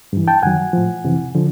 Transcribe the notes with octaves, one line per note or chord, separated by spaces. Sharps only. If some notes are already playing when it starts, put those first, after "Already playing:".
G2 E3
G5 A5
F#2 D#3 F#3 F#5 G#5
A2 F3
F2 C3 E3
D3 F3